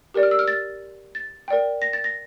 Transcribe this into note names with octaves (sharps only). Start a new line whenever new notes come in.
G4 A#4 D5
F6
E6
F6
A6
A6
A#4 D5 G5
A#6
A6
A#6